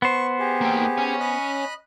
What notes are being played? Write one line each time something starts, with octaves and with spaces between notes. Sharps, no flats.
B3 C5 C#6
G4 G#4
A#3 G5
C#5 G#5
D#5 B5 F#6